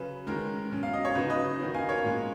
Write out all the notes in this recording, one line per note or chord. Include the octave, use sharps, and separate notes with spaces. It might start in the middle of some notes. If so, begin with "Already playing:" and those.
Already playing: C#3 F#3 C#4 B4
D#3 G#3 C#4 A#4
B2 F#3 C#4
F5
D#5
C#5
C#3 F#3 B3 D#4 B4
B4 D#5
D#3 F#3 B3 D#4
F5 G#5
A#4 C#5
A#2 G#3 C#4